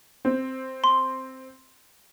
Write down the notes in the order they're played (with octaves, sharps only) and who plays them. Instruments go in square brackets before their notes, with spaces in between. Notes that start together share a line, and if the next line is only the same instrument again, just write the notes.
[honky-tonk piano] C4
[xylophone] C6